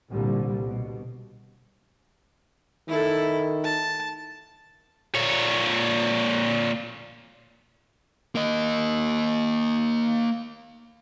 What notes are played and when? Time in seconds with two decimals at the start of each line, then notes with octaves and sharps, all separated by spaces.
0.10 C2 A#2 D3 G3
0.67 B2
2.89 D#3 E4 A4
3.64 A5
5.15 A#2 C#5
8.35 A#3 D#5